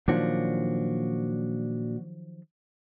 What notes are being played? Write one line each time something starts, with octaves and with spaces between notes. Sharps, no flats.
A#2 D#3 F3 F#3 D4 F#4